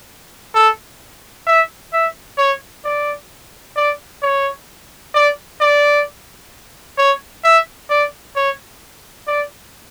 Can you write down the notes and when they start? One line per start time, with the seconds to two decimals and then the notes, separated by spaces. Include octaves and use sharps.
0.55 A4
1.47 E5
1.93 E5
2.38 C#5
2.85 D5
3.76 D5
4.22 C#5
5.14 D5
5.61 D5
6.98 C#5
7.44 E5
7.90 D5
8.36 C#5
9.27 D5